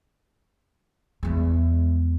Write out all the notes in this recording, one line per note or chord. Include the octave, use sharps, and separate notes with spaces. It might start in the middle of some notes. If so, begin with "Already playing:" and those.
E2 G#3